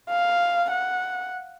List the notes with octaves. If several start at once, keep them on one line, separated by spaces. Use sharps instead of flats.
F5
F#5